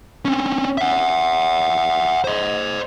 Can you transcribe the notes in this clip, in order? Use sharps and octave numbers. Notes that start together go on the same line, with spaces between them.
C4 C#4
E5 F#5
C5 D#5